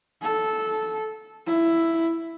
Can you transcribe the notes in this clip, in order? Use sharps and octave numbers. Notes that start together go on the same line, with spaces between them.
A4
E4